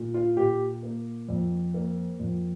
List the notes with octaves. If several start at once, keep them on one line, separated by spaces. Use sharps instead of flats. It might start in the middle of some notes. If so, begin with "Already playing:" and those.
Already playing: A#2
F4
A#2 G4
A#3
F2
A#3
F2